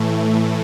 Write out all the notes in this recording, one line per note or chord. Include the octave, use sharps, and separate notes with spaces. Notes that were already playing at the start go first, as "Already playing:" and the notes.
Already playing: A2 E3 A3